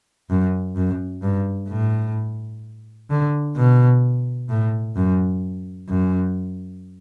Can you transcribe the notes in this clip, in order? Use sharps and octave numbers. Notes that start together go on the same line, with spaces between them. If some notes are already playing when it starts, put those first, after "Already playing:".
F#2
F#2
G2
A2
D3
B2
A2
F#2
F#2